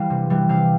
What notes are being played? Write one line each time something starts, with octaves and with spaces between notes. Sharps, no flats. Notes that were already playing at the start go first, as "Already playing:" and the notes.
Already playing: E3 G3 F5
C3
E3 G3
C3 F5